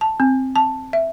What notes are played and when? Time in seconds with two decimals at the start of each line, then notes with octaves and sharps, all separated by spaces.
0.01 A5
0.20 C4
0.56 A5
0.93 E5